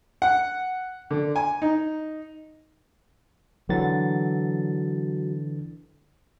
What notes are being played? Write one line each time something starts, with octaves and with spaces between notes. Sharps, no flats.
F#5
D3
G#5
D#4
D3 E3 F#3 A6